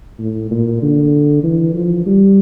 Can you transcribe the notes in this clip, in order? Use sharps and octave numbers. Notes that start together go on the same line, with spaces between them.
A2
A#2
D3
E3
F3
G3